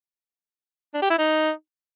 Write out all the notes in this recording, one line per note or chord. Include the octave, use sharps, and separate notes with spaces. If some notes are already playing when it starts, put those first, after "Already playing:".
D4
G4
E4
D#4